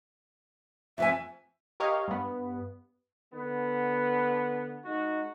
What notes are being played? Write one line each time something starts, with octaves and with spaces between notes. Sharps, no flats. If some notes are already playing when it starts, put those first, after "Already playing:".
F2 F3 E5 G#5
G4 A#4 C#5 D#5 F5
G2 B3
D3 B3
G#3 D#4 F#4